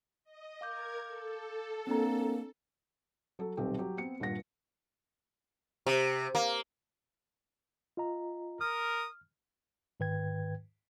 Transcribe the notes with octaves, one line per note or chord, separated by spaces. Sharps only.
D#5
A#4 F5 D6 G6 G#6
A4
A#3 C4 D4 A#5
F#3 A4
D#1 B1 C4 G4 A4
F#3 G4
B3 C4 C#7
D#1 G2 A#2 F#5 A#6
C3
A#3
F4 D#5 A#5
A#4 D#6 F6
G#2 D#3 B4 G5 G#6